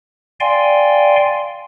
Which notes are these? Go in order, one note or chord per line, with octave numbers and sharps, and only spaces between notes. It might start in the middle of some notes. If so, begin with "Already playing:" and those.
D5 F5 G5 G#5 C6